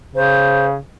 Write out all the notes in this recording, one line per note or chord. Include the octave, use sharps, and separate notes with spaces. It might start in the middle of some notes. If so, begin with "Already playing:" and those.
C#3 C5